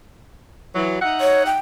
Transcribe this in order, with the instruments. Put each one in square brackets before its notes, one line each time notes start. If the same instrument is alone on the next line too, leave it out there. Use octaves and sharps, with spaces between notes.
[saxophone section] E3 F#3
D#4 E5 F#5
[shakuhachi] C#5
G5